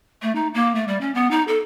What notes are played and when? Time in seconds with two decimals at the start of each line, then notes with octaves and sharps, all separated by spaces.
0.22 A3
0.35 D#4
0.54 A#3
0.75 A3
0.88 G3
1.01 C#4
1.15 B3
1.31 D#4
1.48 A4